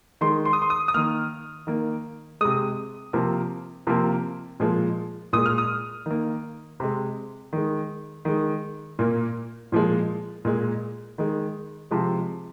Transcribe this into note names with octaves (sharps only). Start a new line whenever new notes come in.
D#3 G#3 C6
C6
D#6
C6
D#6
D#6
D#3 A#3 F6
D#3 A#3
C3 G#3 D#6
C3 F3 A#3
C3 F3 A#3
A#2 F3 G#3
A#2 G#3 D#6
F6
D#6
D#3 A#3
C3 G#3
D#3 G#3
D#3 G#3
A#2 A#3
A#2 F3 G#3
A#2 G#3
D#3 G#3
C3 F3 G#3